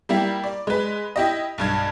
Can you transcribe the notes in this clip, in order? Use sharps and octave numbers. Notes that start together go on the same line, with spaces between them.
G3 A#3 E4 G4
D5
G#3 B4
E4 G4 D#5
B1 G2 G#6